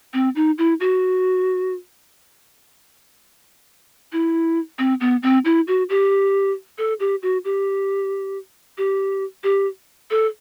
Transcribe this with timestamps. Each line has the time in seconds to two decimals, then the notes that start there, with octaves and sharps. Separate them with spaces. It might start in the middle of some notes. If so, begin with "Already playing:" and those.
0.14 C4
0.36 D#4
0.58 E4
0.80 F#4
4.12 E4
4.79 C4
5.01 B3
5.23 C4
5.45 E4
5.68 F#4
5.89 G4
6.78 A4
7.00 G4
7.22 F#4
7.45 G4
8.78 G4
9.44 G4
10.11 A4